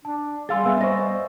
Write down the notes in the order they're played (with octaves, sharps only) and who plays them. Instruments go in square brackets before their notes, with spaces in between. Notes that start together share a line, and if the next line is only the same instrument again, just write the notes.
[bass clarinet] D4 [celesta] A5
[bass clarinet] G3 [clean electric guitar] G#4 F5 C6 [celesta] G#5 E6 A6
[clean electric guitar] B3 [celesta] E5 G#5 E6
[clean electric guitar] C5 D#5 [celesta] C#6 A#6